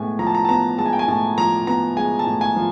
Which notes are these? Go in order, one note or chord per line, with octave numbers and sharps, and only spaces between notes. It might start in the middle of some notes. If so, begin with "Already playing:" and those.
Already playing: A2 G#3 B3 G#5
F3 A#5
A5
A#5
A5
B3 A#5
G#3 A5
G#5
G5
G#5
A2 A5
F3 A#5
B3 A#5
G#3 G#5
A5
A2
G#5
F3